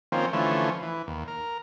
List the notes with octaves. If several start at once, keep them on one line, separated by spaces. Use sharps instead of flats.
D#3 F3 A#3 C4 C#4
D3 E3 F3 A3 C#4
E3
D#2
A#4